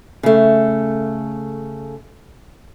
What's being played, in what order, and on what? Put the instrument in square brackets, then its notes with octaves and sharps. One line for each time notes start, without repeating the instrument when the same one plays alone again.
[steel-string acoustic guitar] C#3 A3